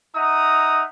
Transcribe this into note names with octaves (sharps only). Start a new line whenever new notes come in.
D#4 E5 F#5 A#5 D#6